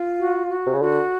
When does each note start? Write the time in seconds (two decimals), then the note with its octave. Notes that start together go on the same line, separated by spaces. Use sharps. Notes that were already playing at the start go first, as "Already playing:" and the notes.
Already playing: F4
0.18 F#4
0.49 F#4
0.66 C3
0.73 C#3
0.81 D3 F#4